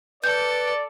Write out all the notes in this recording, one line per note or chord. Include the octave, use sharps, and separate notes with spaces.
A4 B4 D5 G6